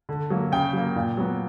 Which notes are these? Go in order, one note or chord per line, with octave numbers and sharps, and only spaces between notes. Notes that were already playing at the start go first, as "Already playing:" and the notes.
D3
F#3 A#3
C#3 G5
F#3 A#3
A#2
F#3 B3